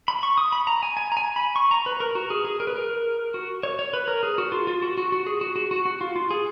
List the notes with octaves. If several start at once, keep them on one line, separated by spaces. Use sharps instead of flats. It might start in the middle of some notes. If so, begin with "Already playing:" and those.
B5
C#6
D#6
B5
A#5
G#5
G#5
A#5
G#5
B5
C#6
A#5
B4
A#4
F#4
G#4
G#4
A#4
B4
A#4
F#4
C#5
C#5
B4
A#4
G#4
F#4
F4
F4
F#4
F#4
F#4
G#4
F#4
F#4
F#4
F#4
F4
F4
G#4